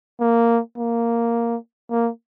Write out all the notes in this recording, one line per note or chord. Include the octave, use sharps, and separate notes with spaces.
A#3
A#3
A#3